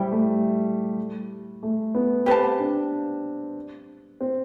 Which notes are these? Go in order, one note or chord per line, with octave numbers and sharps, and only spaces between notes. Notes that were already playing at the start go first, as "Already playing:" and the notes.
Already playing: G3 E4 G4 C5
A3
A3
B3
C4 G4 B4 F5 A5
D4
C4